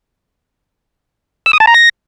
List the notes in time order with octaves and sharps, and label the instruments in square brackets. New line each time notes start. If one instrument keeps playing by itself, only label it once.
[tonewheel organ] E6
D#6
A5
A#5
A#6